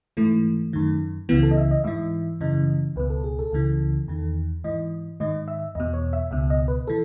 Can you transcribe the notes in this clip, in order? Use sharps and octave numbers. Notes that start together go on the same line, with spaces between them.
G#2 E3 A3
F#2 D#3
C#2 C#3 E3 B3
A4
D#5
E5
D#5
G#2 E3 E5
F#2 C#3 E3 D#5
C#2 B2 B4
A4
G#4
A4
C#2 C#3 E3
E2 D#3
G#2 E3 D#5
G#2 D#3 D#5
E5
E2 B2 D#5
C#5
E5
C#2 B2 E5
D#5
B4
E3 A4